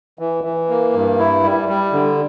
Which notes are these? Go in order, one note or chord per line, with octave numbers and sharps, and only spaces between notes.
E3
E3
A#3
G2
E4
G3
G3
D3